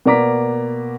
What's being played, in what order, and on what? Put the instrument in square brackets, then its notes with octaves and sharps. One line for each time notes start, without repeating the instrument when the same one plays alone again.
[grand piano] B2 A#3 D5 A#5 D6 B6